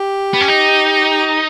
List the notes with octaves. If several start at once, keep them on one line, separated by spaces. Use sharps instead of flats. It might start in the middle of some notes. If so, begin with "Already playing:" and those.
Already playing: G4
B3
C#4
D#4